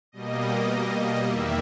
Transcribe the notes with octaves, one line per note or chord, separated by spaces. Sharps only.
B2 G3 A#3 D#5
E2 D#3 G3 A#3 E5